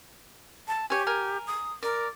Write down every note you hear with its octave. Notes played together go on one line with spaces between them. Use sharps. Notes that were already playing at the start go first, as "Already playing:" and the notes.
A5
G4 C#5 G#5
A#4 G#5
D#6
A#4 D5